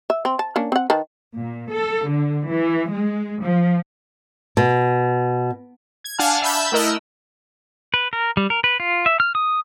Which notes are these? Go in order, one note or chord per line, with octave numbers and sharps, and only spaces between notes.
E5
C4
A5
A#3 C#4 D4
C4 F#5
D#3 B4 A5
A#2
A4
D3
E3
G#3
F3
B2
G#6
D4 F5 F#5 G#5 A5 F6
E5 A5 B5 E6 G6
A3 E4 A#4 D#5 E6 F#6
B4
A#4
G3
A#4
B4
F4
E5
F6
D#6